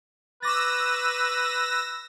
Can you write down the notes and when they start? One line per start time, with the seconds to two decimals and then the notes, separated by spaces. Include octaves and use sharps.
0.42 B4 C#6 D6 E6 A6 A#6